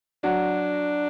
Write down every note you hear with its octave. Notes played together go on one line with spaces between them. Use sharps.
F#3 D4 F#4